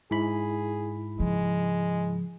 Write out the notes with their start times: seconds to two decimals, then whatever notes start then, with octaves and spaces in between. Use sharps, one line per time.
0.11 G#2 E4 G#4 B5
1.19 C#3 F3 G#3